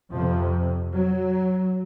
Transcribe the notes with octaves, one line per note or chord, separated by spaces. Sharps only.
F2 C3 F3
F#3